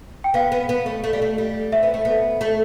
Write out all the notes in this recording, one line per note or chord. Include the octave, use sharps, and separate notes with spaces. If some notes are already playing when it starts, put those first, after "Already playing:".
G5
B3 F5
B3
B3
A3
A3
G3
A3
G3
C4 E5
B3
A3
B3
A3